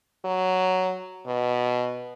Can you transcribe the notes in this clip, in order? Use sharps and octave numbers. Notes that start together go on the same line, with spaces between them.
F#3
B2